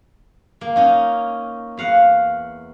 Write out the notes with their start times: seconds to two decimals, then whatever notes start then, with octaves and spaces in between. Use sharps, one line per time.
0.61 A#3
0.76 C#4 D#4
1.77 E2 F5 F#5